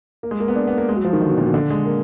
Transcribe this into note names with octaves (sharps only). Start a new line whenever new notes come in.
A#3
G#3
A#3
B3
D4
B3
A#3
G#3
F#3
F3
D#3
D3
B2
A#2
B2
D3
G#3
A#3